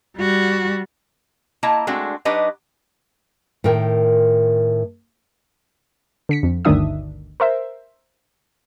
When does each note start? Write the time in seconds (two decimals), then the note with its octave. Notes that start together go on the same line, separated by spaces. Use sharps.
0.18 G3 F#4
1.63 A#3 E4 D#5 A5 A#5
1.87 G#3 A3 C4 D4 F#4
2.25 F#3 D4 D#4 G4 B4 D#5
3.64 A2 D#3 A#4 G5
6.29 D3 B6 C#7
6.43 F2
6.65 G1 D2 D#3 D4 E5 D#6
7.40 A#4 C5 E5